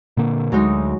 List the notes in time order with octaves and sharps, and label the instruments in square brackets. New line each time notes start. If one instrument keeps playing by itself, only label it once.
[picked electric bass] A#2 D3 A#3
[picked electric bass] D2 [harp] F#3 G#3 D#4